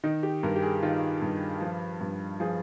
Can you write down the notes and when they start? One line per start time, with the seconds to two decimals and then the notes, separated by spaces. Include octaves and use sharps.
0.04 D#3 D#4
0.23 G4
0.43 G2 A#4
0.56 G4
0.62 G#4
0.83 D#3 F4
1.22 G2
1.61 F3
2.01 G2
2.40 F3 G#4